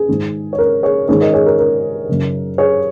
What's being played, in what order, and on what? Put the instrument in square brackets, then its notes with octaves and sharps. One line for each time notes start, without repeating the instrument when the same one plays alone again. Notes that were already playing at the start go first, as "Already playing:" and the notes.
Already playing: [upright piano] G#4
G#2 D#3
C#5
A#4
G#4 C#5
G#2 D#3 G#4 C#5
A#4 D#5
G#4 C#5
A#4
A#4
F#2 C#3
G#4 C#5